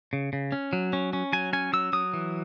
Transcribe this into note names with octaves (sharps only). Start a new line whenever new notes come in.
C#3
C#3
C#4
F#3
C#4
C#4
F#3 G#5
C#4 G#5
F#3 E6
F#3 D#6
E3